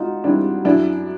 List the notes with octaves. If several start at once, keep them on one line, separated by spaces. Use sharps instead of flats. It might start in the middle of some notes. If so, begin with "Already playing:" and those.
Already playing: G#2 D#4 F4 F#4
D#3 G3 C4 D4 E4
F#2 D4 E4